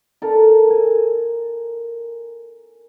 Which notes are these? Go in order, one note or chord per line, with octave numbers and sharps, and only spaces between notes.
A4 A#4 A#5
G#5